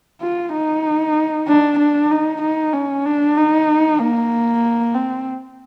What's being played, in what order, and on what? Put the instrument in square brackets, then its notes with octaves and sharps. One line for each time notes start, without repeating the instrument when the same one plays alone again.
[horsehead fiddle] F4
D#4
D4
D4
D#4
D#4
C#4
D4
D#4
A#3
C4